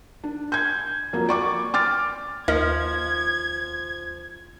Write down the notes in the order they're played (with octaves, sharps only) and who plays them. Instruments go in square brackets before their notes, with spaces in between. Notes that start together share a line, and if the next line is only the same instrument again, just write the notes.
[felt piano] D4
G6 G#6
F2 F#3 A#3
D5 C#6 D6
D6 F6 A6
[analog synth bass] D#2 [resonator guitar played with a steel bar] F3 [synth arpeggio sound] D#4 A#4 D#5 [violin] G#6